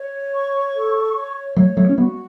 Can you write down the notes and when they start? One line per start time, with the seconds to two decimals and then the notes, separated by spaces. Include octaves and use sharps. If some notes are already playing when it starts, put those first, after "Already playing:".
Already playing: C#5
0.35 C#6
0.75 A4
1.16 C#5
1.56 F#3 A3 C#5
1.77 F#3 A3
1.89 C#4
1.98 G3 B3 F#4